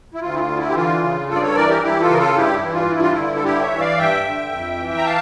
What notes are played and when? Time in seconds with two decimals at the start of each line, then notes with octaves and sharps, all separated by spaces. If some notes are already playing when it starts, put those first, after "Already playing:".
0.14 E4
0.21 D2 F4
0.34 E4
0.39 F4
0.48 D3
0.57 E4
0.70 G4
0.75 E3 F4
1.02 C#3
1.29 G2 F4 A4
1.35 D5
1.42 A4 C#5
1.55 E3 A#4 D5
1.69 G4 A#4
1.82 E3 E4 G4
2.00 F4 A4
2.09 C#3 A#4
2.18 F4 A4
2.36 G2 E4 G4
2.54 E4
2.63 E3
2.73 F4
2.90 G2 E4
3.01 F4
3.12 E4
3.17 D3
3.35 A4
3.44 G2 E4 G4
3.62 C#5 E5
3.71 E3
3.80 D5 F5
3.98 G2 E5 G5
4.25 D3
4.51 F2
4.79 E3
4.98 A#5
5.05 F5 A5